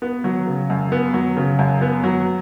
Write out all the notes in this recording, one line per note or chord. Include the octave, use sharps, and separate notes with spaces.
B3
F#3
C#3
F#2
B3
F#3
C#3
F#2
B3
F#3